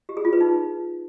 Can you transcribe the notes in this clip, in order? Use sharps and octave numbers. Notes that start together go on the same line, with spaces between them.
G4
G#4
F4
B4
D#4